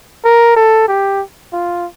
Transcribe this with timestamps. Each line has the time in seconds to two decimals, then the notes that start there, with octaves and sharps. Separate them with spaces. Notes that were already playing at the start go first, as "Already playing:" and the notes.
0.25 A#4
0.56 A4
0.88 G4
1.53 F4